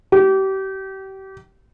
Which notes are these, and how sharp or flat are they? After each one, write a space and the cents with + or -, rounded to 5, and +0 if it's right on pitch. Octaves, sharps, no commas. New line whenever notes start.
G4 -30